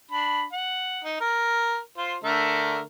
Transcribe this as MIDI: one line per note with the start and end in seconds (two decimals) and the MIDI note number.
0.11 0.44 62
0.11 0.44 83
0.53 1.03 78
1.04 1.17 63
1.20 1.79 70
1.98 2.16 65
1.98 2.16 72
2.24 2.81 50
2.24 2.81 57
2.24 2.81 70